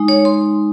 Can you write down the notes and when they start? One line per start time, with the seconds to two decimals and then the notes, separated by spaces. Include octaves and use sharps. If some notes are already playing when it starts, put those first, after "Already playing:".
Already playing: G#3 D#4
0.08 C#5
0.25 C6